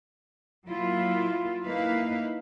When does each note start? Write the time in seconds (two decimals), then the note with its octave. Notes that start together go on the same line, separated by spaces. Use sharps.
0.69 F#3 A#3 E4 F4
1.64 A#3 D#4 E4 B4 F5